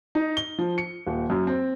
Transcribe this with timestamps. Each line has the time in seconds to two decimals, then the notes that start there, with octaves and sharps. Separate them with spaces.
0.15 D#4
0.37 G7
0.58 F3
0.78 C#7
1.07 D#1
1.30 F#2
1.47 C4